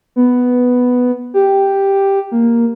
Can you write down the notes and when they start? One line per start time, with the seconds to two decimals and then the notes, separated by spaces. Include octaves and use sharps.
0.16 B3
1.34 G4
2.32 A#3